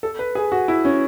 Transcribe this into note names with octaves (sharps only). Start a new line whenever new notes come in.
A4
B4
G#4
F#4
E4
C#4